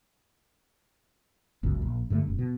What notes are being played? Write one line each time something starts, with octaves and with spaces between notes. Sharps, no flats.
G1 C#2 F#2
A#1
G2 D3 D#3 A3
E1 F#2
B2